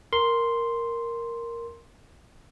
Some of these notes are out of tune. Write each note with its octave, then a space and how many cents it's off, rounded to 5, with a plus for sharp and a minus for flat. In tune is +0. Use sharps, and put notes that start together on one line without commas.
A#4 +0 C6 +0